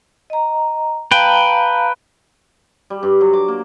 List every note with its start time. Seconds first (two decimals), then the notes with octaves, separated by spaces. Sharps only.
0.30 D#5 A#5
1.11 B4 F5 G5 A5 A#5
2.90 G3
3.03 G2
3.21 F#3
3.33 D6
3.48 A#3